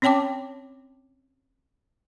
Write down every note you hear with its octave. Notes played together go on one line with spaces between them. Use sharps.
C4 C#4 C#5 G5 A5 D6